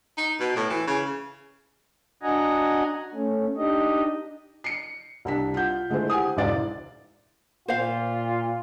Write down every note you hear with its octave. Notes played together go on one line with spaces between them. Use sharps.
D#4
B2
A2
E3
C#3
D4 F#4 D#5 F#5 G#5 A#5
A3 C#4
D4 D#4 G4 D#5
C7 C#7
C2 D4 B6
F4 F#5 G6
D3 G#3 A3 E4 C5
G4 F#5 G#5 D#6
E1 C#2 G#2 E4 D5 A6
A#2 F4 C5 F5